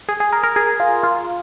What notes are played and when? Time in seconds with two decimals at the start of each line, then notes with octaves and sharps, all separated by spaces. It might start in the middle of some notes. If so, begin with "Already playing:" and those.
0.09 G#4
0.20 G#4
0.32 A#4
0.43 A#4
0.56 G#4
0.80 F4
1.03 F4